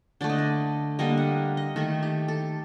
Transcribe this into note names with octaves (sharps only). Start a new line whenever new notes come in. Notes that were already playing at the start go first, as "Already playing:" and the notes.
D3 A3 D5
D#5
D5
D3 G3 A#3 D#5
F#5
D#5
D#3 A3 A4
G4
A4